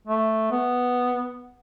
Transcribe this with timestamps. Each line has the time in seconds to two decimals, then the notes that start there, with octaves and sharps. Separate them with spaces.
0.07 A3
0.51 B3